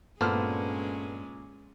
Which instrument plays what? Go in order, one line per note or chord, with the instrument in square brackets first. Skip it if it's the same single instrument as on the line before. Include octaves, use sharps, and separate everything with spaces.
[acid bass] G2 [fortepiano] A#2 F6 [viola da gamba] G#3 C#4 [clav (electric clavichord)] B3 A4 C5